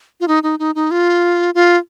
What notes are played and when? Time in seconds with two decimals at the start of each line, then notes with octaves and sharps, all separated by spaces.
0.20 F4
0.28 D#4
0.43 D#4
0.59 D#4
0.75 D#4
0.91 F4
1.55 F4